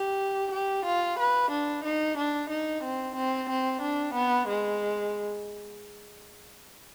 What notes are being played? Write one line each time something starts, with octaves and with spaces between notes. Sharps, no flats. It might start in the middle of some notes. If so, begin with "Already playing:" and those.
Already playing: G4
G4
F4
B4
D4
D#4
D4
D#4
C4
C4
C4
D4
B3
G#3